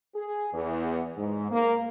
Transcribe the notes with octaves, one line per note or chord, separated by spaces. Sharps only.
G#4
E2
G#2
A#3